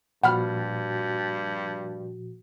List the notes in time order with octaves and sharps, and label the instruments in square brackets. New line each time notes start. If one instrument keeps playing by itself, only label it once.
[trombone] G2 [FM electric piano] A#2 F3 F#4 [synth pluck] F#5 B5 F6